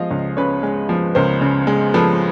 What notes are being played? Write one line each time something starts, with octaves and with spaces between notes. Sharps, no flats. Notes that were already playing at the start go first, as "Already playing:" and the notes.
Already playing: F3 G#3 D#5 F5
C#2
C#3 B4 C#5
G#3
F3
C#2 A#4 C5
C#3
G#3
F3 A4 B4